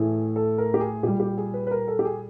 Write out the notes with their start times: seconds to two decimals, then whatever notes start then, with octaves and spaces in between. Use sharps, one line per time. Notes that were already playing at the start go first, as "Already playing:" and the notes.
Already playing: A2 E3 A3 G#4
0.36 A4
0.58 A#4
0.74 G4
0.80 G#4
1.03 A#2 G3 G4
1.20 G4
1.38 G#4
1.54 B4
1.67 B4
1.71 A#4
1.88 A4
1.99 G4
2.05 G#4